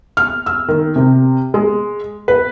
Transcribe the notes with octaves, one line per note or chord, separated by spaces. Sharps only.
F6
E6
D#3
C3
G#3
B4